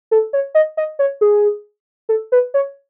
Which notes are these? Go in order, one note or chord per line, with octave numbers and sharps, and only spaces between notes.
A4
C#5
D#5
D#5
C#5
G#4
A4
B4
C#5